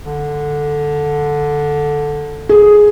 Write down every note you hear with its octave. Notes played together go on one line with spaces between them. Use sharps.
D3
G#4